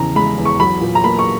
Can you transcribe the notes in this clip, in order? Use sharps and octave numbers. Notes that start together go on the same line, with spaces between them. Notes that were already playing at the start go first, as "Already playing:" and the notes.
Already playing: E2 C#3 A#5
G#3 B5
E2
C#6
F#3 B5
A#2
A#5
A#3 B5
C#6